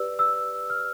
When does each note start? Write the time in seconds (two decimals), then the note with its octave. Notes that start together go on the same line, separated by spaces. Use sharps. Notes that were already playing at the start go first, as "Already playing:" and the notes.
Already playing: G4 B4 D5 E6
0.19 E6
0.70 F6